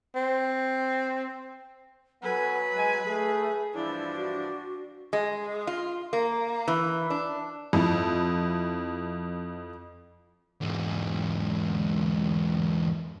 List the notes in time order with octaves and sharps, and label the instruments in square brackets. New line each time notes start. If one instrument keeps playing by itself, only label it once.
[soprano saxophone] C4
[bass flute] F#3 [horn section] B3 A4 G#5 [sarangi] B4
[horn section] G#3 G#5
[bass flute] A3 [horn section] G#4
[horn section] G2 E3 F3 [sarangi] D4 [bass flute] E4
[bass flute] F#4
[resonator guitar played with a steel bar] G#3
F4
A#3
E3
D4
[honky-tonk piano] F2 E4
[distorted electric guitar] E2 G#2